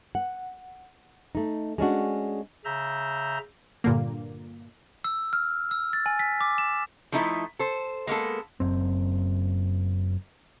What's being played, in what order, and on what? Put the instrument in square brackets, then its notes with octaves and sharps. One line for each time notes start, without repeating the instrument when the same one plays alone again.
[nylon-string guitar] F#5
A3 D#4
G#3 C#4 D4 F#4
[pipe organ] C#3 E5 A#5 G6
[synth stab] G2 A#2 D3 A#3
[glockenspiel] E6
F6
E6
A6
G#5
B6
D6
E7
[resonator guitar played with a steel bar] F3 A3 D#4 E4 A4
A4 C5
G#3 A#3 B3 A4
[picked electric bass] F#1 F#2 C4